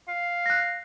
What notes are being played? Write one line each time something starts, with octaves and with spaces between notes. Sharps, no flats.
F5
F#6 A#6